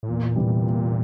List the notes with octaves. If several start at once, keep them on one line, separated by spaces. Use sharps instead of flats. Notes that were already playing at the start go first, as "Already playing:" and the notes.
A2
E2 A#2
C3 E3 G3